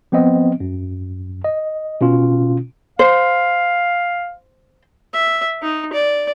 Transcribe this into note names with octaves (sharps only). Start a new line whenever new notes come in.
F3 B3 C4 D#5
F#2
D#5
B2 C#4 F4
C5 F5
E5
D#4
D5